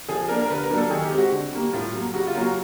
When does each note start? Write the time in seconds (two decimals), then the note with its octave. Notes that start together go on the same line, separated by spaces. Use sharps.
0.09 F3 G#4
0.28 A#3 D4 A#4
0.41 A#4
0.50 D3 B4
0.63 A#4
0.70 F#3 A#3 D4
0.77 A4
0.90 D#3 G#4
1.05 G4
1.11 G#3 C4
1.18 F#4
1.32 D3
1.52 G3 A#3
1.73 A2 F4
1.93 F#3 A#3
2.14 C#3 F#4
2.27 F4
2.34 F#3 A#3 C#4
2.41 F#4